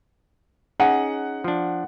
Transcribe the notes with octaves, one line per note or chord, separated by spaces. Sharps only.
C#4 D#4 G#4 F#5
F3 D4